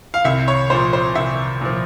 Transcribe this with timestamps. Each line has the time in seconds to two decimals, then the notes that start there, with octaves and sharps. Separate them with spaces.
0.14 F5
0.25 C2 E5
0.48 C#5
0.70 A#2 F3 C5
0.93 C5
1.15 C2 E5
1.61 A#2 F3